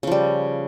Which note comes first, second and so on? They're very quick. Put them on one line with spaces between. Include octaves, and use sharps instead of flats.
C#3 F3 G3